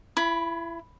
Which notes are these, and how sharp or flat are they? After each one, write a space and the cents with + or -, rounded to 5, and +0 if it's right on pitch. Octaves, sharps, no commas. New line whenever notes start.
E4 +30 B5 +0